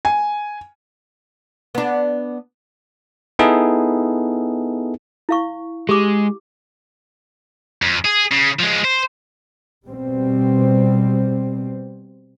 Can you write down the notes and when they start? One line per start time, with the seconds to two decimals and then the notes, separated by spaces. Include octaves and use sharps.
0.05 G#5
1.75 B3 D4
3.39 B3 D#4 E4 G#4 A4
5.29 E4 F5 C#6
5.89 G#3 G4 D6
7.82 F2
8.05 G#4
8.32 C#3
8.60 F3 G#3
8.84 C5
9.85 B2 G3 C4